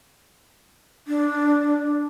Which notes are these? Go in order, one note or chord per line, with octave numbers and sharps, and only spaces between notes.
D4